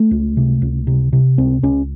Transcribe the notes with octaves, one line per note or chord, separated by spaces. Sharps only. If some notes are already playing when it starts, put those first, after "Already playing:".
Already playing: A3
C#2
C3
C#2
C3
C3
C#2 C4
C#2 C#4